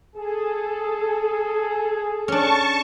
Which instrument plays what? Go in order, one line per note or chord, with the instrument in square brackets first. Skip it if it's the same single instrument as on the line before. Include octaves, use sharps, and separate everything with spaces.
[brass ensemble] G#4 [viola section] A4
[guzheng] C#4 D4 [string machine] A5 C#6